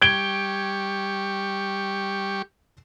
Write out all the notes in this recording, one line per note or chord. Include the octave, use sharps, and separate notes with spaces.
G3 G4 C#6 G#6 D7 G7